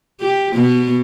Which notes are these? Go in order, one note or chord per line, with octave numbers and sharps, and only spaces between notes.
G4
B2 B3